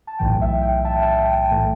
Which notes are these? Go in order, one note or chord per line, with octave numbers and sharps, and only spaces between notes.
A5
B1 A2 E3 G5
E5
G5
E5 A5
E5 A5
G5
G5
A2 E3 A3 G5